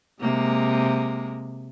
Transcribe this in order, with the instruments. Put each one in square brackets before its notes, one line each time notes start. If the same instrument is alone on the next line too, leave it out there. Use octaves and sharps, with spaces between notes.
[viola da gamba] C3 G#3 A#3